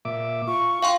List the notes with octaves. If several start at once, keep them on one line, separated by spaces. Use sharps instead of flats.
A#2 E5 D6
F4 C#6
F5 G5 C6